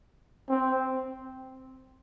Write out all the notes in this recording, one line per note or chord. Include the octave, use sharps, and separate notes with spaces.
C4